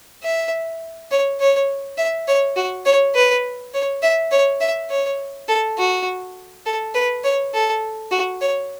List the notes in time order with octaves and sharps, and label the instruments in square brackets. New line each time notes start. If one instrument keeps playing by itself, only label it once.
[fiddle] E5
C#5
C#5
E5
C#5
F#4
C#5
B4
C#5
E5
C#5
E5
C#5
A4
F#4
A4
B4
C#5
A4
F#4
C#5